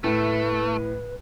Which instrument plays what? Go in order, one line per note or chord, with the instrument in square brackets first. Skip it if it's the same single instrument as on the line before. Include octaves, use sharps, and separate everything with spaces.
[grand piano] A2 [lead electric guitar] A3 [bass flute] B4